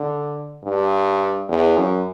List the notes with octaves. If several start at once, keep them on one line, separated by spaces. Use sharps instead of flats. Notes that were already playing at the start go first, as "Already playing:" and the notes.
Already playing: D3
G2
E2
F#2